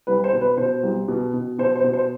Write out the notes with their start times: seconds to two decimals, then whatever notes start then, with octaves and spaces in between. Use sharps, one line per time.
0.07 C2 B4
0.24 C5
0.33 B2
0.41 B4
0.57 B2 C5
0.83 C2
1.08 B2
1.34 B2
1.59 B2 C5
1.76 C5
1.84 B2
1.93 C5